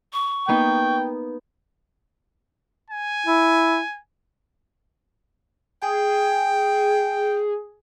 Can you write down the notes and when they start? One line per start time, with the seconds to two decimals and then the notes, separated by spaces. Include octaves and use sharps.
0.13 C#6
0.48 A#3 B3 D#4 G5
2.91 G#5
3.26 E4
5.82 G#4 G5